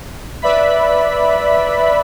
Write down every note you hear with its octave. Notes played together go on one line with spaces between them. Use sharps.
B4 D5 E5 B5 B6